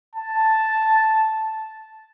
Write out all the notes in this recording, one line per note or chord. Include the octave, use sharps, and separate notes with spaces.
A5